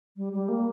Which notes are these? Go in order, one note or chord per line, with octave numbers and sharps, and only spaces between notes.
G3
G3
A#3